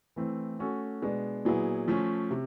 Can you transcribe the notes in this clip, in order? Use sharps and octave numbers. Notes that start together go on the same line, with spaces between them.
E3 A3 C4
A3 C#4 F#4 A4
B2 G#3 B3 D4
A#2 F#3 B3 E4 G#4
F3 A3 C#4
C3